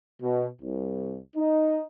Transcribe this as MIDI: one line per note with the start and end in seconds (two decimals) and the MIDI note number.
0.22 0.47 47
0.62 1.18 36
1.37 1.83 63